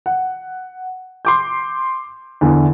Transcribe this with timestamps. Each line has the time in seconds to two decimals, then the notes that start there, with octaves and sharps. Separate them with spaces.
0.06 F#5
1.25 C6 D6 G6
2.41 E2 D3 E3